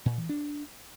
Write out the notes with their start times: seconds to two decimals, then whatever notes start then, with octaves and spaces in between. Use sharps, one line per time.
0.06 A#2
0.17 E3
0.29 D4